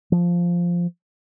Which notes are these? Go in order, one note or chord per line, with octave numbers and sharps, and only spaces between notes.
F3